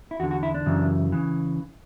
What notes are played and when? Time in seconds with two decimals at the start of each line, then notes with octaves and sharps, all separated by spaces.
0.11 E4
0.20 E2 F#4
0.23 D3
0.31 F#4
0.43 E4
0.54 D4
0.66 F#2 C#3 E3
1.12 C#3 E3